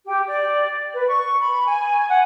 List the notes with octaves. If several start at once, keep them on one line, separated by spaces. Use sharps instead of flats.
G4
D5
B4
C#6
B5
G#5
F#5